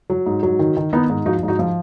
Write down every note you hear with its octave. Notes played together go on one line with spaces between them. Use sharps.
F#3
G#2
F#3
D#3
D#3
D#3 B3 D#4
G#2
F3 D#4 F#4
G#2
D#4 F#4
F3